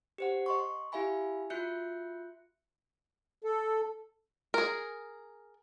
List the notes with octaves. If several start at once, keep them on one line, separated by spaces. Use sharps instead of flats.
G4 C5 F#5
D#5 C6 C#6
E4 G4 E5 F5 G#5 B5
F4 F#4 E5 F#6 G6 C#7
A4
G#4 A#4